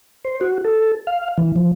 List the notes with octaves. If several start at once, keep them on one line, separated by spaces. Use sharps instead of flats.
C5
F#4
A4
F5
E3
F3